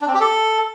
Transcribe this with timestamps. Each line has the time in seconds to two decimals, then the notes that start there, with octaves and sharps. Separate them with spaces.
0.01 D4
0.08 C4
0.14 G4
0.21 A4